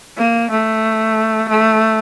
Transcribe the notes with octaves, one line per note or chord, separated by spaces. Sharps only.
A#3
A3
A3